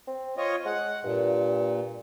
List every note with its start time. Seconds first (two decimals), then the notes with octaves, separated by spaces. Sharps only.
0.08 C4
0.38 C4 F4 C#5 D#5
0.66 G#3 F#5
1.04 G2 A#2